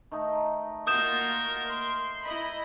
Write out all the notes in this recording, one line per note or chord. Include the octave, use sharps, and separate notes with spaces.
D#3 A3 D#4
A#3 F4 F#4 A#4 D#6 G6 E7
C6
E4 D#5 B5